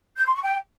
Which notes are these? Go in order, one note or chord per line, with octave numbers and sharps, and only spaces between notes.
G6
C6
C#6
G5